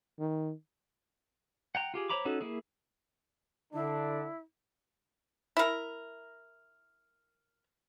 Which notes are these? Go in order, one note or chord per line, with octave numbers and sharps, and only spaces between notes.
D#3
F#5 G5 A#5
F4 G4 G#4
C5 C#5 A#5 B5 D6
C#4 D#4 F#4 A4
A#3 E4 G#4
D3 D4 E4
E4 A#4